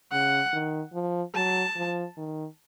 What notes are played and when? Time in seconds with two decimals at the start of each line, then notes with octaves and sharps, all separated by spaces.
0.12 C#3 F#5
0.53 D#3
0.94 F3
1.35 F#3 A5
1.76 F3
2.17 D#3